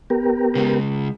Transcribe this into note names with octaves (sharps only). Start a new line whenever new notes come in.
B3 G4 A#4
C#3 G#3